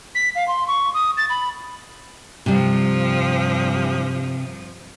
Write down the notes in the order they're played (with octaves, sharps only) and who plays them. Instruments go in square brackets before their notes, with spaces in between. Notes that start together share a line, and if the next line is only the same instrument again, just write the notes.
[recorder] B6
F5
C6
C#6
D#6
A6
B5
[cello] G2 F3 [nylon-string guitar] C3 G3